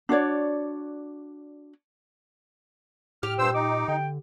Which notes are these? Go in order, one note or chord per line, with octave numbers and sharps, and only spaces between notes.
D4 F#4 C#5 D5
A2 G4 F6
G2 A#2 C5 E6
D#4 D6
D3 G5